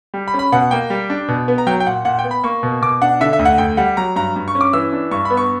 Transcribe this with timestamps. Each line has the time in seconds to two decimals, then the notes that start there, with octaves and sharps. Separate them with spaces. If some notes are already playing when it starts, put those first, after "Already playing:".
0.14 G3
0.28 B5
0.34 C#4
0.39 B5
0.52 B2 F#5
0.71 A#3 G5
0.90 G3
1.10 D4
1.28 B2
1.48 B3
1.58 A#5
1.67 F#3 G5
1.80 G5
1.86 A#2 F#5
2.05 A#2 F#5
2.19 G5
2.24 B3
2.31 B5
2.44 A#3 C#6
2.63 B2
2.82 B2 D6
3.02 D4 F#5
3.21 D3 E5
3.33 E5
3.39 D2
3.45 F#5
3.58 D2 G5
3.77 G3 F#5
3.97 F#3 A#5
4.16 G2 A#5
4.36 G2
4.48 C#6
4.55 C#4
4.61 D6
4.73 E3 E6
4.93 D4
5.11 G2 C#6
5.25 B5
5.30 B3
5.37 C#6